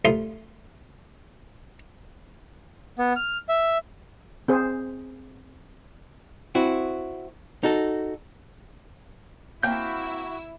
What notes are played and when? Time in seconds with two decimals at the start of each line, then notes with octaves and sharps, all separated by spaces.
0.05 C2 A3 F4 C6 D#6
2.99 B3
3.16 F6
3.49 E5
4.48 C4 G#4 C5
6.55 C4 E4 F#4
7.63 D#4 F#4 A4
9.63 A#3 C4 E4 F#4 G5 E6 G6